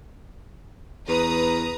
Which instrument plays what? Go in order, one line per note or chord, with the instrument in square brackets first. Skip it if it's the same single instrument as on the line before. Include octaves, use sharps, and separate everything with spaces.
[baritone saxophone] E2 [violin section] B4 A#5 D#6